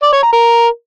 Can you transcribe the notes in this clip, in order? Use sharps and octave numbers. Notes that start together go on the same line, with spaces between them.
D5
C#5
A#5
A#4